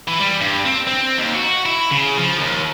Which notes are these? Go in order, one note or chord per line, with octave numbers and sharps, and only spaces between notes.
E3
G3
G2
C4
C4
D#2
F#4
E4
C#3
F3
D#2